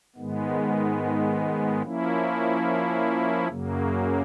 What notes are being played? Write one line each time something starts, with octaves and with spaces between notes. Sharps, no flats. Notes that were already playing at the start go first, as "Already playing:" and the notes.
G#2 D#3 G#3 B3
F3 A#3 C#4 E4
F#2 C#3 F#3 A#3